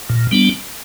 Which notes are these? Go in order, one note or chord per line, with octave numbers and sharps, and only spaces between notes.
A#2
G3 B3 D4